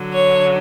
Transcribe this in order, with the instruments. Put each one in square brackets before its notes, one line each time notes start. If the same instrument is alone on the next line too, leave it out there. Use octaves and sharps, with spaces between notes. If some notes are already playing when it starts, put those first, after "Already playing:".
Already playing: [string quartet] D3 F#3
C#5